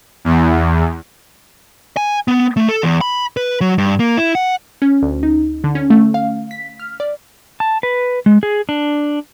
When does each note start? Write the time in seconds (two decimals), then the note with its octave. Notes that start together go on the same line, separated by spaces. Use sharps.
0.25 E2
1.97 G#5
2.28 B3
2.57 A3
2.69 A4
2.83 E2
3.01 B5
3.37 B4
3.61 F#3
3.78 G2
4.00 A#3
4.17 E4
4.35 F#5
4.82 C#4
5.03 D2
5.23 D#4
5.64 D3
5.75 C#4
5.90 A3
6.14 F5
6.51 B6
6.80 F6
7.00 D5
7.60 A5
7.83 B4
8.26 G#3
8.43 G#4
8.69 D4